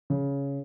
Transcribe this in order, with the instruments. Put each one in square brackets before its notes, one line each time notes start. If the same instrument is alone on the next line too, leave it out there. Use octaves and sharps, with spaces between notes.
[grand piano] C#3